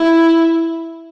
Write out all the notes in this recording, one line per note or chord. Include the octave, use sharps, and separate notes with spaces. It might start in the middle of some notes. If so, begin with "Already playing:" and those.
Already playing: E4